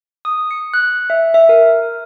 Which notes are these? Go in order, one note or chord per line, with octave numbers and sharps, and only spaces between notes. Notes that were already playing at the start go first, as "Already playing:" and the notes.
D#6
C#7
F#6
E5
E5
A#4